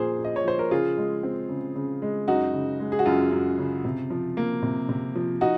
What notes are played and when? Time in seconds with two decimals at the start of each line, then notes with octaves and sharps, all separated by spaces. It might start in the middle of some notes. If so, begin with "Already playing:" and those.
Already playing: A#2 F3 A#3 G#4 C5
0.19 A#2
0.24 D#5
0.36 C#5
0.45 F3 C5
0.59 A#4
0.71 C#3 F4 G#4
0.98 G#3
1.23 C4
1.49 C#3
1.76 C#3
2.02 G#3
2.28 F#2 D#4 F#4
2.54 C#3
2.80 G#3
2.92 G#4
2.99 F#4
3.06 F#2 F4
3.32 F#2
3.59 C#3
3.85 C3
4.10 F3
4.37 A#3
4.63 C3
4.89 C3
5.16 F3
5.41 D#4 F#4